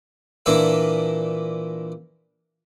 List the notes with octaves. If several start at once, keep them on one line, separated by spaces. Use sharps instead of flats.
A#2 E3 A#3 D4 E4 A4